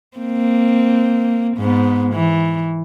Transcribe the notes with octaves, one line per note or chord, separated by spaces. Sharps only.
A#3 C4
G#2 B3
E3